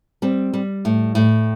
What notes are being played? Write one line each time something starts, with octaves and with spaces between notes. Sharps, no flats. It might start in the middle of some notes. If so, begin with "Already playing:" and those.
G3 C4
G3
A2
A2